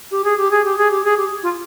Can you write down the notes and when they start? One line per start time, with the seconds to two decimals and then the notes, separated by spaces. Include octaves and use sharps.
0.11 G4
0.24 G#4
0.37 G4
0.50 G#4
0.64 G4
0.77 G#4
0.90 G4
1.03 G#4
1.17 G4
1.43 F4